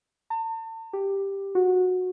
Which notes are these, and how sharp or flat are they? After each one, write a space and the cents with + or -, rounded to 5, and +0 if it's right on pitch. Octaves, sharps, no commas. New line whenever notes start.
A5 +40
G4 +5
F#4 -15